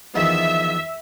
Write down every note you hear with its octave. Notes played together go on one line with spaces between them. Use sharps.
E2 D#3 F3 E5